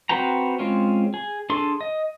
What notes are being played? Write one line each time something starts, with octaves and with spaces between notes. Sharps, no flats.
C4 F#4 B4 G5 A#5
G#3 C4 C#4 F4
G#4
D4 G#4 A4 C6
D#5